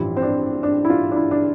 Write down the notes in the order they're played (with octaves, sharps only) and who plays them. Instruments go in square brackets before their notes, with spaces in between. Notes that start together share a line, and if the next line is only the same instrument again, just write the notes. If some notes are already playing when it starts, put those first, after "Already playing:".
Already playing: [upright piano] A1 G2 F3 E4
C4
D4
D4
E4
F4
D4
E4
D4